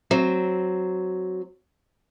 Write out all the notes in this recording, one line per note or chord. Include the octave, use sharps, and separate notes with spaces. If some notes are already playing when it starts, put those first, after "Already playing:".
F#3 C4